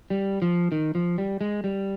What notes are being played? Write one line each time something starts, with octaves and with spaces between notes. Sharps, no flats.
G3
F3
D#3
F3
G3
G#3
G3